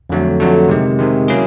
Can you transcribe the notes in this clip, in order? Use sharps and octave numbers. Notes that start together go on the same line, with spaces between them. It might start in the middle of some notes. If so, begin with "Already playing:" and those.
F2 D3 F#3 A3
F2 D3 F#3 A3
C3 D#3 G#3
C3 D#3 G#3
F#3 A#3 C#4 E4 G#4